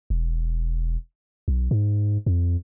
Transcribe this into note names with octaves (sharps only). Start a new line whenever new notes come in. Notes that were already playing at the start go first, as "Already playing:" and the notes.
E1
B1
G#2
F2